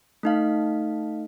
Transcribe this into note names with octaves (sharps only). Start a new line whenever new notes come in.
A3 D#4 F5